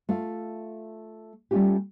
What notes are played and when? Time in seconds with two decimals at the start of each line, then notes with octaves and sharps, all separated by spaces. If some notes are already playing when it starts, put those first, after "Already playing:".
0.09 A3 F4 F5
1.51 G3 A3 A#3 C#4 F4 G4